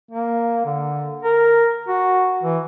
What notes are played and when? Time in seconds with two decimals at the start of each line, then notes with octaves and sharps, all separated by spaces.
0.11 A#3
0.65 D3
1.23 A#4
1.88 F#4
2.43 E3